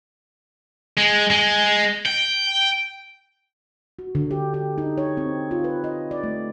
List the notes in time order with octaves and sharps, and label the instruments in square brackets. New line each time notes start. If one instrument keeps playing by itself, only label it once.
[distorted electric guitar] G#3
G#3
G5
[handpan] F#4
D3
G4
G4
D#4
C#5
C4
F4
B4
D#5
D5
A3